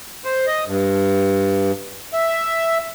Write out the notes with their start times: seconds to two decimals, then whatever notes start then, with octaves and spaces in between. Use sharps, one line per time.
0.25 C5
0.47 D#5
0.67 G2
2.13 E5